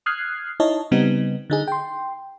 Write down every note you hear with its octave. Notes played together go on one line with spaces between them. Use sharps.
D#6 F6 F#6 G#6 C7
D#4 E4 C#5 D#5 A5
C#3 G3 B3 C4 D#4
D3 D#4 G#4
G5 C6